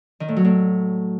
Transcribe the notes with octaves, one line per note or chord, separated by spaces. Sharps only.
D#3
A2
F#3
A2